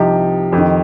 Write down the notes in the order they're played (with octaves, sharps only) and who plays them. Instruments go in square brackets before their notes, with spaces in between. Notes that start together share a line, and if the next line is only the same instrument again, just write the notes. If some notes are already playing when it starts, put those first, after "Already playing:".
Already playing: [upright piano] C2 C3 F3 D#4 G4
F2
D#3